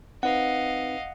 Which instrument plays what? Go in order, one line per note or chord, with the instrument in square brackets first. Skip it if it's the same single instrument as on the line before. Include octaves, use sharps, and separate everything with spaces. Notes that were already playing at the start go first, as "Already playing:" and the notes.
[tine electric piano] C4 D#4 B4 [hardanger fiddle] D#5 F5 [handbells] F#5